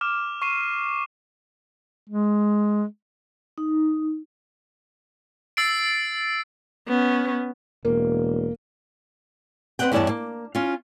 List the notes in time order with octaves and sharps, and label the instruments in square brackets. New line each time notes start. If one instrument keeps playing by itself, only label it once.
[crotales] D6 F6 E7
C#6 C7 D#7 E7
[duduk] G#3
[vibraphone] D#4
[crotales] E6 A6 C7 D7
[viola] B3 C#4
[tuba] E1 [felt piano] A#3
[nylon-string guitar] C4 B4 C5 D#5 F#5 G5
E2 G2 E4 C#5 D5 A5
A#3
C#4 F4